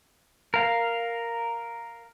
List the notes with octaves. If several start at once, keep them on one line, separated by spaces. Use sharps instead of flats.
A#4 F5